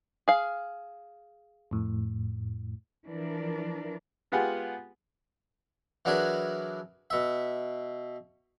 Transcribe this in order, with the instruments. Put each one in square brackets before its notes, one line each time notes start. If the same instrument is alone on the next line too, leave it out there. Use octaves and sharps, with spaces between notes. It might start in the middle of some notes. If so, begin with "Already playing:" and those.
[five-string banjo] G#4 F5
[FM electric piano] F2 A2
[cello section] E3 F3 D4 A#4
[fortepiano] G#3 B3 F4 G4 F#5 G#5
[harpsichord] E3 F#3 D4 G#4 A#4 B4
B2 E5